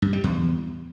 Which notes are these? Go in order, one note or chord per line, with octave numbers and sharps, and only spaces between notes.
G2
G3
E2